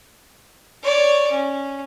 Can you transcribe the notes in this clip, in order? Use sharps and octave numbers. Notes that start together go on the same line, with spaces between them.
C#5 D5
C#4